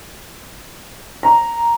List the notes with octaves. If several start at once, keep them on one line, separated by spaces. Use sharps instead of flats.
A#5